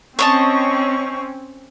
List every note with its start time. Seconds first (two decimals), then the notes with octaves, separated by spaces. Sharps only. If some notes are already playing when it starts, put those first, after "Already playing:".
0.19 C4 C#4 C#5 D#5 A5 C#6